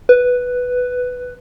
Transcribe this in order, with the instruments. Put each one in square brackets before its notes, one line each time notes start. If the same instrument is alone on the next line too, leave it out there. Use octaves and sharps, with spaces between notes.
[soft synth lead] B4